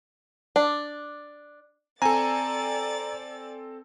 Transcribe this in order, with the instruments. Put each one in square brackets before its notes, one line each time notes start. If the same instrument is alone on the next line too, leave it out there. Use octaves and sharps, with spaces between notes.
[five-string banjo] D4
[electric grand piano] C4 A4 [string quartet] D5 A6 [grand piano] G#5 [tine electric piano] A#5